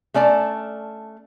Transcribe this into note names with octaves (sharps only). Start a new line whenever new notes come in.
A3 C#4 D5 A5